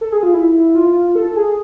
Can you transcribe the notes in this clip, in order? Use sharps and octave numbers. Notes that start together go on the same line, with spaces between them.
A4
G#4
F4
E4
F4
A4
G#4